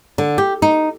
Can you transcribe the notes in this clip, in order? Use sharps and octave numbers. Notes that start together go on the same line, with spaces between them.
D3
G4
D#4